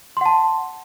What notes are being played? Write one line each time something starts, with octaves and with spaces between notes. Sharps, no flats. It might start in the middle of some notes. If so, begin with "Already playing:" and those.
F#5 A5 C6